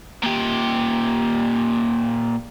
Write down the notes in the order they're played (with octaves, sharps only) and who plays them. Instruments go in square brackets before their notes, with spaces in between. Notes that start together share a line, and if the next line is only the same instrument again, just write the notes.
[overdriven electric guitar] A#2 G4